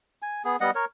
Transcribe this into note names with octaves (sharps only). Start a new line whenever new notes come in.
G#5
B3 G#4
G3 B3 D#5 F#5
A#4 C#5